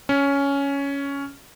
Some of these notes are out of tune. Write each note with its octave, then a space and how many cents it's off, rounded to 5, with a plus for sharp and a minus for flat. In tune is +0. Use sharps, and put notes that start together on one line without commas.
C#4 +10